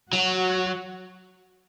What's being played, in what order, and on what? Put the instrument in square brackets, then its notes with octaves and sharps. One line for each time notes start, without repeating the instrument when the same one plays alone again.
[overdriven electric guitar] F#3 [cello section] F#4